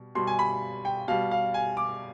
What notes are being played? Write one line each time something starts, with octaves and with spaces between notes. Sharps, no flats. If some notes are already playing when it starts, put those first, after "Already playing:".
Already playing: B2 G3
B2 G3 C6
G#5
B5
G5
B2 G3 F5
F5
G#5
D6